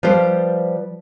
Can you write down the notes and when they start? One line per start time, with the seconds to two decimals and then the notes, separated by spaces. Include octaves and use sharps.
0.03 F3 G3 F4 B4 C5